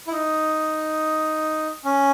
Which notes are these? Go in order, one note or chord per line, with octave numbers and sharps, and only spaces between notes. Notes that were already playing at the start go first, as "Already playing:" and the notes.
E4
D#4
C#4